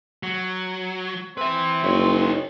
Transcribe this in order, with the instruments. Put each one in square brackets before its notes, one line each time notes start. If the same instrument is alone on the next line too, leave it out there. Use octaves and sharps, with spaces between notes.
[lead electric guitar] F#3
[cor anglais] C4 [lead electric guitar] B4 E5
[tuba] F#1 [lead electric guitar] D#4 C#5